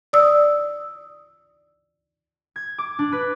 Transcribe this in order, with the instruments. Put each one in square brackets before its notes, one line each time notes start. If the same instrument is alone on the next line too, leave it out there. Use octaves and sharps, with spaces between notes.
[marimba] D5 D#6 E6
[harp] G#6
D6
D4
B4